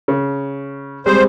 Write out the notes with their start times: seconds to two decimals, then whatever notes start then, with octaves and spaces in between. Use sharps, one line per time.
0.08 C#3
1.06 G3 G#3 C4 C5